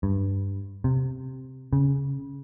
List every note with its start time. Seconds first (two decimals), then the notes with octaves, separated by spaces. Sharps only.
0.03 G2
0.84 C3
1.73 C#3